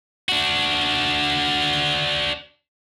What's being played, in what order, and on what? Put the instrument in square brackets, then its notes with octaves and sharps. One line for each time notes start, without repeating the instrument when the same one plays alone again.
[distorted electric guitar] D4 F#4